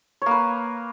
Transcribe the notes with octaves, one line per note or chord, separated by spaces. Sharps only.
A#3 B4 C#5